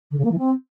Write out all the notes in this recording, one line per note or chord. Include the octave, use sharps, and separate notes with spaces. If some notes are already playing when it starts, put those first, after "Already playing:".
D3
C#3
A#3
E3
C4